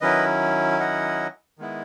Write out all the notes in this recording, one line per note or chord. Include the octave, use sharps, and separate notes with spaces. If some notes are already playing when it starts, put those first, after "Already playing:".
D#3 F#3 C#4 E4 B4 D#5
D#5 F#5
D#3 G#3 B3 E4